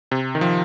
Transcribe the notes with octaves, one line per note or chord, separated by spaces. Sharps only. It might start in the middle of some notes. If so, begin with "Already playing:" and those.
C3
D#3
F3